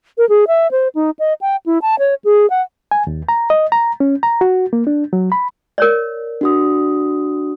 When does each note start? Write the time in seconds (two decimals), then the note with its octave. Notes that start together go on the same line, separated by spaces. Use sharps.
0.18 A#4
0.29 G#4
0.48 E5
0.71 C5
0.95 D#4
1.19 D#5
1.41 G5
1.66 E4
1.82 A5
1.99 C#5
2.25 G#4
2.50 F#5
2.91 G#5
3.07 D#2
3.29 A#5
3.50 D#5
3.72 A#5
4.00 C#4
4.23 A#5
4.41 F#4
4.73 A#3
4.87 D4
5.13 F#3
5.32 B5
5.78 A#4 C#5 D5
6.41 D4 F#4 D#6